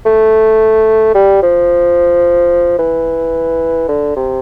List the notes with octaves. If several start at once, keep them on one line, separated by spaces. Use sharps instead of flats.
A3
G3
F3
E3
D3
C3